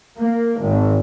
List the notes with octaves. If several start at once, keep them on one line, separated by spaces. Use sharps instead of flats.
A#3
G#1